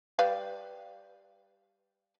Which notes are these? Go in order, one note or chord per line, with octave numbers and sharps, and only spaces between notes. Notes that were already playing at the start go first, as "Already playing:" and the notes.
G3 B4 F5